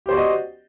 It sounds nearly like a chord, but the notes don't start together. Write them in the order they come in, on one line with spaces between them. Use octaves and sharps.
G4 C5 D5 F#4 D#5